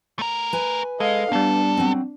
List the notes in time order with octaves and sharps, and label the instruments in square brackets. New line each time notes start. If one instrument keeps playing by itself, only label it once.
[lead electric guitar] A3 A#4
[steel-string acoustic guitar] B4 G#5
[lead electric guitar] G#3 [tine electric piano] A4 [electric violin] D#5 F5
[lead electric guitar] B1 A4 [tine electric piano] G3 B3 [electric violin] D4
[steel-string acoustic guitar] F#3 C4